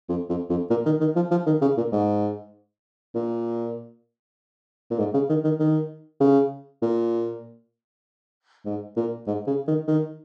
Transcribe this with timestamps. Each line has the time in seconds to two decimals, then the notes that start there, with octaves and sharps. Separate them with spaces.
0.09 F2
0.29 F2
0.50 F2
0.70 A#2
0.86 D#3
1.00 D#3
1.16 F3
1.31 F3
1.46 D#3
1.62 C#3
1.77 A#2
1.92 G#2
3.15 A#2
4.91 A#2
4.99 G#2
5.14 C#3
5.29 D#3
5.44 D#3
5.60 D#3
6.20 C#3
6.82 A#2
8.65 G#2
8.97 A#2
9.27 G#2
9.47 C#3
9.67 D#3
9.88 D#3